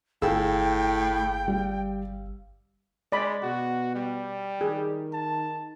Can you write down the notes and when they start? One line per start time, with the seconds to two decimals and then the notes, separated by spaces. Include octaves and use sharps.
0.22 G1 A2 G#4 F5 G5 E6
1.48 G3
3.12 G#3 D5 B5
3.43 B2 F#4
3.95 G3
4.61 D#3 G#4
5.13 A5